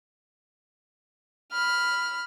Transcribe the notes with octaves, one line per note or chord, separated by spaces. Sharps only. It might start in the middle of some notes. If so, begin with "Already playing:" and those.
B5 F6